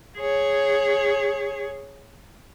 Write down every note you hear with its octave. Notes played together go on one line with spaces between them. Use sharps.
G#4 C#5